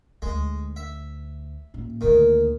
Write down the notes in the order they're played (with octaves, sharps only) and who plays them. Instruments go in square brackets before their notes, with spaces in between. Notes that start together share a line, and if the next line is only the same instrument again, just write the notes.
[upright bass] D2 [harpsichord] G#3
[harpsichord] E5
[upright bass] A1 A#2
[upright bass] D2 A#2 [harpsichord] D#3